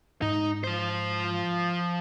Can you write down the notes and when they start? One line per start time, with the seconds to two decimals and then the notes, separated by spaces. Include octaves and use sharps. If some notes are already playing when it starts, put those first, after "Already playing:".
0.22 G#2 G#3 D#4
0.64 F3 C5